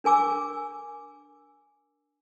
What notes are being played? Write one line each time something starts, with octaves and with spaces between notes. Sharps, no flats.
D4 A#4 G#5 D6 E6